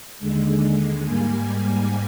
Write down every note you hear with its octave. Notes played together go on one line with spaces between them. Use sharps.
D#2 D3 G#3
G#2 G3 A#3 G#5